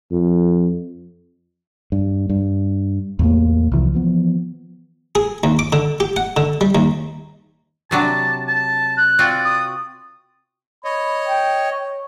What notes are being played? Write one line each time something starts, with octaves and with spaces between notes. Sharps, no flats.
F2
G2
G2
E2 A2 A#3
C2 E3 F3
E3 F3 B3
G#4
D#2
D6
D3
G4
F#5
D3
G3
D#2
C3 F#3 D4 A5
A5
F#6
C4 F4 F#4 D5
D#6
C#5 D#5 B5
G5
C#5